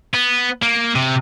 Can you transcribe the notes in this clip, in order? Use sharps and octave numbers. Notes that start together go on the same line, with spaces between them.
B3
A#3
C3